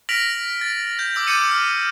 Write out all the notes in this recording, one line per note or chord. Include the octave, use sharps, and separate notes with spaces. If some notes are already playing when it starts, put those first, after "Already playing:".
F6 A#6 B6 D7 F7 F#7
A6
G6
D6 E6 F#7
D6 G6 A6 C#7 D#7
F6